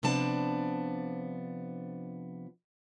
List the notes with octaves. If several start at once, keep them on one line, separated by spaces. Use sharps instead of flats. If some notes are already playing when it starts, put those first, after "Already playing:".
C3 F3 B3 D4 A5